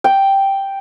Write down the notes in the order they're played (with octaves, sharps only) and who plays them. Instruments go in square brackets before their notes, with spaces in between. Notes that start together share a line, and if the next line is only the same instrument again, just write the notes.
[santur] G5